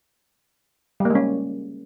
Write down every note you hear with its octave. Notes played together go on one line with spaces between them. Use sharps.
G3
A#3
G#3
C#4